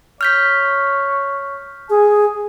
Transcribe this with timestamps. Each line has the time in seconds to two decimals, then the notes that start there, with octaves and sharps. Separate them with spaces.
0.21 C#5 F6 G6 B6
1.90 G#4 G#5